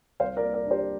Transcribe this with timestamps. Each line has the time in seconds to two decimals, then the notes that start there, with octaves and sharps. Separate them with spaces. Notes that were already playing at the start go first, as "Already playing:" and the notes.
0.20 C2 C5 F5
0.37 A#4 D5
0.43 A#3
0.54 A#4 D5
0.66 D4
0.71 G4 C5